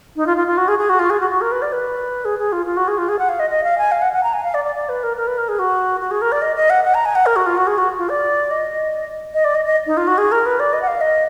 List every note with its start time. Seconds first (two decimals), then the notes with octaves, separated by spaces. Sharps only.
0.16 D#4
0.27 F4
0.37 F4
0.47 F4
0.58 F#4
0.68 G#4
0.79 G#4
0.89 F#4
0.99 F4
1.10 G#4
1.20 F#4
1.31 F#4
1.41 A#4
1.52 B4
1.62 D5
1.72 B4
2.25 G#4
2.39 G#4
2.52 F4
2.66 F4
2.77 F#4
2.88 G#4
2.98 F4
3.09 G#4
3.19 F#5
3.29 F5
3.40 D#5
3.50 D#5
3.64 F5
3.78 G#5
3.92 F5
4.02 F#5
4.13 F#5
4.23 A#5
4.33 G#5
4.44 F5
4.54 D5
4.65 D5
4.75 D5
4.89 B4
5.03 A#4
5.17 A#4
5.27 B4
5.38 A#4
5.49 G#4
5.59 F#4
6.01 F#4
6.11 G#4
6.22 A#4
6.32 D5
6.42 D#5
6.56 D#5
6.70 F#5
6.84 F#5
6.94 A#5
7.05 G#5
7.15 F#5
7.26 A#4
7.36 F#4
7.46 F4
7.57 F#4
7.67 G#4
7.78 F#4
7.98 F4
8.09 D5
8.51 D#5
9.34 D#5
9.45 D5
9.55 D#5
9.65 D#5
9.87 D#4
9.97 F4
10.07 F#4
10.18 G#4
10.32 A#4
10.46 B4
10.60 D5
10.73 D#5
10.82 F#5
10.87 F5
11.01 D#5